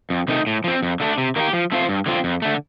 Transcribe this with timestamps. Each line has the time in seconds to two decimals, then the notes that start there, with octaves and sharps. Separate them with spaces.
0.10 F2
0.28 C3 D#3 A3 D#4
0.47 A2
0.64 F3 C4
0.82 F2
1.00 D3 A3 D4
1.18 C3
1.36 D#3 A#3 D4
1.40 G4
1.53 F3
1.72 A3 C4 F4 C5
1.89 G2
2.06 D3 F3 C4 F4
2.24 F2
2.42 D3 A3